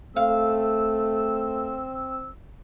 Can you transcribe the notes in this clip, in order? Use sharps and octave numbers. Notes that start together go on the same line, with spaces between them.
A3 C4 F5 E6